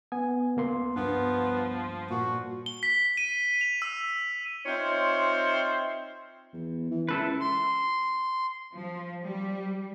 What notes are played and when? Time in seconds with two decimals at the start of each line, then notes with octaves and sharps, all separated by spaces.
0.12 B3 G#5
0.57 C#2 A#3 C6
0.96 G2 F3 B3
2.11 A#2 F#4
2.66 G7
2.83 B6
3.17 D#7
3.61 F7
3.82 E6
4.66 C4 D#4 F4 C5 C#5 E5
6.53 E2
6.91 E3
7.09 C#2 E4 A4 B4
7.40 C6
8.74 F3
9.24 G3